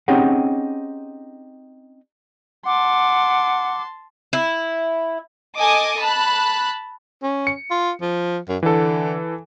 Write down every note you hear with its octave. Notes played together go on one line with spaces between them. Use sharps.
C4 C#4 D#4 G4 G#4 F#5
F#5 A5 C6 D6
E4
A4 D#5 G#5 D6 D#6
A5 B5 F#6
C#4
C#7
F4
F3
F#2
D3 E3 A4